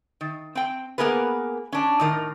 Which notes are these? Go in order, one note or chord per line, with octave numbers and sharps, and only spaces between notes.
D#3
C4 G5
A#3 B3 G#4 A#4 B4
C#4 D4
A2 D#3 A#4